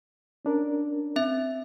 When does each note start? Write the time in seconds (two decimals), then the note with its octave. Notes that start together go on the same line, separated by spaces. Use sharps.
0.45 C#4 D4 A#4
1.16 C4 E5